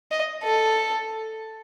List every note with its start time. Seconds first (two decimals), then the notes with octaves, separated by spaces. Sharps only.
0.11 D#5
0.44 A4